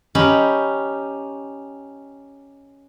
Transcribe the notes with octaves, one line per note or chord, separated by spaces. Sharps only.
C#4 D#4 G4 G5 B5